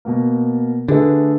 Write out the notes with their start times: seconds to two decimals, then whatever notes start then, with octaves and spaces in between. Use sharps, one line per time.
0.05 B2 A#3
0.88 D3 A3 G#4 B4